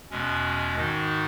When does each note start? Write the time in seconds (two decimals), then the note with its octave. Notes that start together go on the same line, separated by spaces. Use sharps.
0.10 E2 B2 G#3 C#4
0.75 G#2 D#3 G#3 D#4 F#4